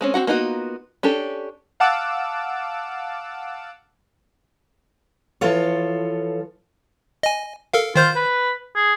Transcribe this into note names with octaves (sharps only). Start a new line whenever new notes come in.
G#3 C4 C#4
C4 F4 F#4 F#5
A#3 B3 D#4 F4 F#4
C#4 D4 G4 A4
F5 F#5 A5 D6 E6
E3 F3 F4 A4 C#5
D#5 G#5
A4 A#4 F5
D#3 F4 C5 G6
B4
G#4